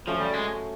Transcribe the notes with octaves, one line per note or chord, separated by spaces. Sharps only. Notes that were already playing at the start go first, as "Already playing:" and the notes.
F3 F#3 A3 C#4
G3
G#3